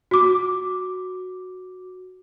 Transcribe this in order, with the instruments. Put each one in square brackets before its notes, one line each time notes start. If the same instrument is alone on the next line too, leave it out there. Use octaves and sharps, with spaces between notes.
[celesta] F#4 D6